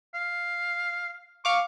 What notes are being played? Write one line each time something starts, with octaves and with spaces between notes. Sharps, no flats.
F5
F5 C#6 D6